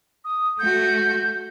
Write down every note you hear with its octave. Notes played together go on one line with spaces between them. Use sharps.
D#6
A3 F#4 G6